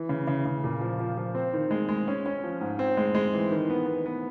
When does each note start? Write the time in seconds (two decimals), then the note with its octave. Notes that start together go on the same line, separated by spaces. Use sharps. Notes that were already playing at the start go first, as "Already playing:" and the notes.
Already playing: E3
0.09 C#3
0.27 C#3
0.45 C#3
0.64 A#2
0.81 F3
1.00 F3
1.17 F3
1.35 C4
1.54 D#3
1.71 G#3
1.89 G#3
2.08 C#4
2.26 C#4
2.44 F3
2.61 G#2
2.79 C4
2.97 G#3
3.15 G#3
3.34 E3
3.52 D#3
3.70 B3
3.87 B3
4.06 B3